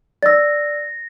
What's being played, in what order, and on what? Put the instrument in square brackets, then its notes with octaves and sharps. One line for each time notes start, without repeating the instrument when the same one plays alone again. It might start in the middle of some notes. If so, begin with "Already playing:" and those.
[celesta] D5 E6 [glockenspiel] A6 A#6